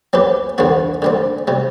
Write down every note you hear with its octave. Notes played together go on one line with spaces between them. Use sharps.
F#3 C4 G4 B4
E2 D3 G3 C4 F#4
D3 G3 C4
C3 G3